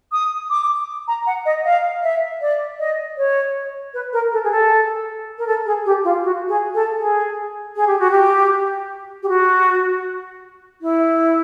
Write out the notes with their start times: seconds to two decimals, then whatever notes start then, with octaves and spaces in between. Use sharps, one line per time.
0.12 D#6
0.50 D6
1.07 A#5
1.26 F#5
1.45 D#5
1.65 F5
2.03 E5
2.41 D5
2.79 D#5
3.17 C#5
3.94 B4
4.13 A#4
4.32 A4
4.44 G#4
4.51 A4
5.38 A#4
5.47 A4
5.66 G#4
5.85 G4
6.04 F4
6.23 F#4
6.48 G#4
6.74 A4
6.99 G#4
7.76 G#4
7.87 G4
7.99 F#4
8.11 G4
9.23 G4
9.28 F#4
10.81 E4